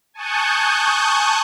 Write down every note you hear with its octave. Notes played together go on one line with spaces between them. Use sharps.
G#5 A5 C#6 D#6 F#6 G6